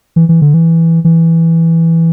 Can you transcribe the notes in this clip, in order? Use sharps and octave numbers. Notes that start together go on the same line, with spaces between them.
E3
E3
D3
E3
E3